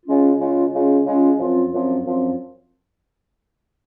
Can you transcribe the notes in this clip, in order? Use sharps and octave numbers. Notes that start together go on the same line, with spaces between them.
C#3 G#3 C#4 F4
C#3 G#3 C#4 F4
C#3 G#3 C#4 F4
C#3 G#3 C#4 F4
F#2 F3 C4 F4
F#2 F3 C4 F4
F#2 F3 C4 F4